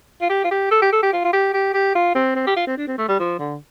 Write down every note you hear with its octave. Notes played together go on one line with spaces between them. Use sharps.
F4
G4
F4
G4
A4
G4
A4
G4
F4
F4
G4
G4
G4
F4
C4
C4
G4
F4
C4
D4
C4
A3
G3
F3
D3